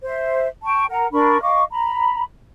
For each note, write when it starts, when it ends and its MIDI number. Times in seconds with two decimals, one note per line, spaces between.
0.03 0.47 72
0.03 0.47 76
0.64 0.84 79
0.64 0.84 81
0.64 0.84 85
0.90 1.07 70
0.90 1.07 78
0.90 1.07 82
1.12 1.40 62
1.12 1.40 70
1.12 1.40 83
1.12 1.40 85
1.41 1.64 75
1.41 1.64 77
1.41 1.64 85
1.41 1.64 86
1.70 2.22 82
1.70 2.22 83